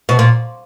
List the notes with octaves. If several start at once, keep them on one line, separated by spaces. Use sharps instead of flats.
B2
A#2